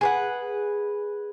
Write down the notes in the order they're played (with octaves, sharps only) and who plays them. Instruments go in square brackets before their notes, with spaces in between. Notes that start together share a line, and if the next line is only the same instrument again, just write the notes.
[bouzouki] G#4 B4 F#5